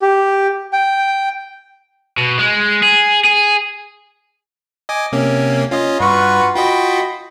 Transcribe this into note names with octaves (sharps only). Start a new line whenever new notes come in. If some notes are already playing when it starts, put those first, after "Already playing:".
G4
G5
B2
G#3
G#4
G#4
D#5 G#5 D6
C3 A#3 C#4
C#4 F4 D#5
G2 F4 F#4 B4 C#6
F4 F#4 D#5 G5 B5